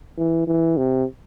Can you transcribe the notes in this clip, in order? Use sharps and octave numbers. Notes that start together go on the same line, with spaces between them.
E3
E3
C3